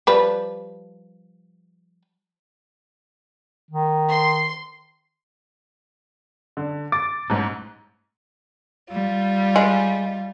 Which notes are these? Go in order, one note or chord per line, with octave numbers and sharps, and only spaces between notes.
F3 G3 B4
D#3
C6
D3
D6 A6
A1 G#2
G3 F4
G#3